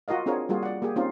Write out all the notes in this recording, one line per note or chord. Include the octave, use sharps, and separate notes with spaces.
F4 F#4 A#4 D#5 F5
C4 D4 F4 G#4 A#4 C#5
G3 A#3 F4 F#4 G#4
D5 F#5
A#3 G4 G#4
A#3 C4 C#4 D#4 F4